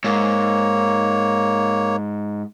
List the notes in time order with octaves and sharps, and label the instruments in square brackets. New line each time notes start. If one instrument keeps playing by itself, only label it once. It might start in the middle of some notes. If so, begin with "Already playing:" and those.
[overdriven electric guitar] G#2 [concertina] A#3 C#5